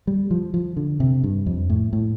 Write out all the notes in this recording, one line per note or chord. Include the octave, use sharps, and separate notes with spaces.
G3
F3
F3
D3
C3
G2
F2
A2
A2